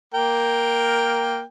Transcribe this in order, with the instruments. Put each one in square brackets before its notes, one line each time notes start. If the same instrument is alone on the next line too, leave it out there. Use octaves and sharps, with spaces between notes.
[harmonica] A#3 A#4 G5